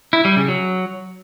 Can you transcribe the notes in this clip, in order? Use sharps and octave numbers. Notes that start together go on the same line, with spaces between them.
E4
G3
C#3
F#3